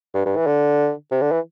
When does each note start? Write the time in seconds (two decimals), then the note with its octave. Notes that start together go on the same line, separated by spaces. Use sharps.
0.14 G2
0.26 G2
0.36 E3
0.47 D3
1.11 C3
1.22 D3
1.32 E3